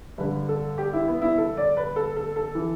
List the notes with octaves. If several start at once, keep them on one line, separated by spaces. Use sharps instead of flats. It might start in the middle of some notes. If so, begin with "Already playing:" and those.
G2 D3 B4
A4
G4
E4
B3
E4
A4
D5
B4
A4
A4
A4
E3